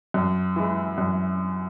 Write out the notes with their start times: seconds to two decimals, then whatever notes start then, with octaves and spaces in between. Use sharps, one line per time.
0.14 F#2
0.56 E3 G#3
0.98 F#2